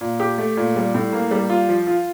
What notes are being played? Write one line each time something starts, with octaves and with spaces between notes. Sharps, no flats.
A#2
G4
A3
A#2
G3
A2
A#3
G3
F4
F3
F4